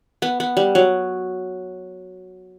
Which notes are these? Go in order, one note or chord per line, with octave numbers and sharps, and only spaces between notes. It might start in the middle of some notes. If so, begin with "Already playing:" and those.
B3
B3
G3
F#3